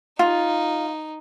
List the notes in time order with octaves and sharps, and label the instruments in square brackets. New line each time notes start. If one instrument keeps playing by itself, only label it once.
[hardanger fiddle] D#4 [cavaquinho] F4